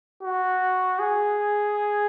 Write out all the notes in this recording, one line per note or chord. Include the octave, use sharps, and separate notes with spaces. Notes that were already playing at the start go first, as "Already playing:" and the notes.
F#4
G#4